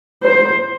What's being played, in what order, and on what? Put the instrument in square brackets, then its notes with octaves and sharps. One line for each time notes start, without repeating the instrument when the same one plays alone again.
[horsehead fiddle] C5